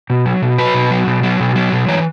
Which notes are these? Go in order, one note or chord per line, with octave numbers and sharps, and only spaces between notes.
B2
F#3
B2
F#3 B4
B2
F#3
B2
F#3
B2
F#3
B2
E3 C#5